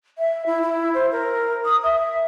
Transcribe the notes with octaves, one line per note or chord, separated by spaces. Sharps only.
E5
E4
E4
C5
A#4
D#6
E5